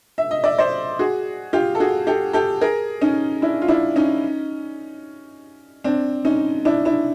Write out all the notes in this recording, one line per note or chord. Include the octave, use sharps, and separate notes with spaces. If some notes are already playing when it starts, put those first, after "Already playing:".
E5
D#5
D5 E5
C5 D5
F#4 G#4
F4 G4
A4
F#4 G#4
G4 A4
G4 A4
G#4 A#4
C#4 D#4
D4 E4
F4
D4 E4
C#4 D#4
C4 D4
C#4 D#4
D4 E4
D4 E4